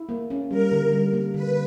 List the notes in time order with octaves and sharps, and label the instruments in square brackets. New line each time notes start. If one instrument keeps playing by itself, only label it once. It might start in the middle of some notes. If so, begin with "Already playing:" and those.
Already playing: [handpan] E4
A#3
C#4
[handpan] G3 [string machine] A#4
[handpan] D3
G3
A#3
[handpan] D3 [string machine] B4